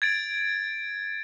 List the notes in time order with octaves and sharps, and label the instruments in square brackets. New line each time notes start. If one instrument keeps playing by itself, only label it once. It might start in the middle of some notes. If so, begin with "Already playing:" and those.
[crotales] G#6 A6 D7